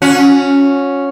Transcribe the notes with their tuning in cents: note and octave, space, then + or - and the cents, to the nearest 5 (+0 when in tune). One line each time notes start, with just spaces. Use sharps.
C#4 +0 F#4 -35